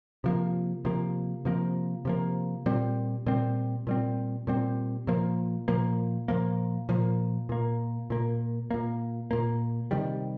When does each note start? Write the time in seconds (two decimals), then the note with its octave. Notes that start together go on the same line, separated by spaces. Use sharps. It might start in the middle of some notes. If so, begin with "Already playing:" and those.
0.24 C3 F3 A#3
0.85 C3 F3 A#3
1.45 C3 F3 A#3
2.05 C3 F3 A#3
2.66 A#2 G3 C4
3.26 A#2 G3 C4
3.87 A#2 G3 C4
4.47 A#2 G3 C4
5.07 A#2 F3 A#3
5.68 A#2 F3 A#3
6.28 A#2 F3 A#3
6.89 A#2 F3 A#3
7.49 A#2 A#3
8.10 A#2 A#3
8.71 A#2 A#3
9.31 A#2 A#3
9.91 C3 D#3 G3